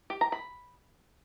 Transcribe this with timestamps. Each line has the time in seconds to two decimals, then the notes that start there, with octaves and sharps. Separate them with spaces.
0.10 G4
0.21 A#5
0.32 B5